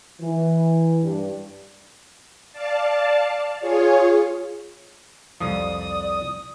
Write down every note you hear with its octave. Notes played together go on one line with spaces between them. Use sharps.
E3
G2
D5 F5 A5
F4 G#4 C#5
C2 F2 F3 D5 D#6